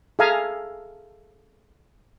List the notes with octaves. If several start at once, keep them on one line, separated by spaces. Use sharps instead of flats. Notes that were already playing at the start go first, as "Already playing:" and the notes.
G#4 A4 E5 F5 G#5 A#5